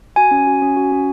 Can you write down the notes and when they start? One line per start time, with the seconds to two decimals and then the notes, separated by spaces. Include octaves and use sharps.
0.16 F#4 G#5
0.31 C#4
0.47 F#4
0.62 C#4
0.77 F#4
0.92 C#4